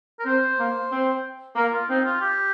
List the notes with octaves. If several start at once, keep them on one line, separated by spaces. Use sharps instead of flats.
A#4
C4 C5
A#3
C4
A#3 A#4
F4
C4 D#4
F4
G4